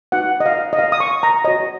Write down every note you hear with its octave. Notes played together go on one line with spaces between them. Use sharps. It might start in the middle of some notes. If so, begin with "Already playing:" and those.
D#4 F#4 B4 F#5
D#5
F5
D#5
F5
D#6
C#6
A#5
F#4 C#5 D#5